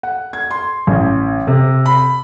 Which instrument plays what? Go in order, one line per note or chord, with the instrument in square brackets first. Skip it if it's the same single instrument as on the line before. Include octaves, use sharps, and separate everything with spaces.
[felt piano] F#5
G#6
C6
A1
C3
B5